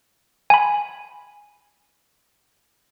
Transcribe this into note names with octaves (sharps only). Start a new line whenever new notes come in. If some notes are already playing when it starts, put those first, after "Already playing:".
G#5 B5